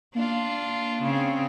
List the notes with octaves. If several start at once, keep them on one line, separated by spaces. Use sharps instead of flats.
A#3 D4 F4
C#3 C4